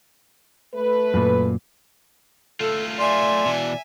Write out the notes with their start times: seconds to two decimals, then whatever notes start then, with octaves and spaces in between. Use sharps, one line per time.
0.75 A3 B4
1.14 F#2 A#2
2.60 A3 F4 A4
2.99 D5 E5 G#5 C6
3.45 B2 E3